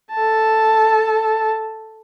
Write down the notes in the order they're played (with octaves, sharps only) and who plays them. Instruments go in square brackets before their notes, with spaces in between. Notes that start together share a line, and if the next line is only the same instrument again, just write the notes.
[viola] A4 A5